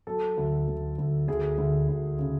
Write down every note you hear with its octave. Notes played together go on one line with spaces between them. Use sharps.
F#3 A4
D2
D2
D2
D2 G#4
D2
D2
C#3